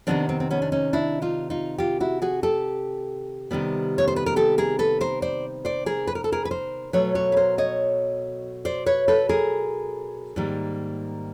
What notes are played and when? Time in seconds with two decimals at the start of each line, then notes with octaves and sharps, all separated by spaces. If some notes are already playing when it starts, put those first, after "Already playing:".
0.07 C3 D#3 G3 B3 C4 D4
0.29 C4
0.40 C4
0.51 B3 C#4
0.62 D4
0.72 C#4 D#4
0.93 D4 E4
1.22 D#4 F4
1.50 D#4 F4
1.78 F4 G4
2.00 E4 F#4
2.22 F#4 G#4
2.43 G4 A4
3.51 C3 D#3 G3 B3
3.98 C#5
4.08 C5
4.16 B4
4.26 A#4
4.36 G4 A4
4.58 G#4 A#4
4.79 A4 B4
5.01 A#4 C5
5.22 C5 D5
5.65 C5 D5
5.86 G#4 A#4
6.07 B4
6.15 A#4
6.24 A4
6.32 G#4 A#4
6.45 B4
6.51 A#4 C5
6.93 B2 F#3 A3 B4 C#5
7.15 B4 C#5
7.32 B4
7.37 A#4 C5
7.58 C#5 D#5
8.65 C5 D5
8.86 B4 C#5
9.08 A4 B4
9.29 G#4 A#4
10.36 G#2 D#3 G3 A#3